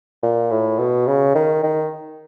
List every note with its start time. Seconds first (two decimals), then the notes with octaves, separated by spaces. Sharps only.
0.23 A#2
0.51 A2
0.79 B2
1.07 C#3
1.35 D#3
1.63 D#3